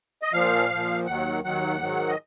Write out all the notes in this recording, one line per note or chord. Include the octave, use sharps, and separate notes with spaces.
D#5
A#2 F3 F5
A#2 F3
D#2 D#3 F#3 F#5
D#2 D#3 F#3 F#5
G#2 D#3 F#3
D#5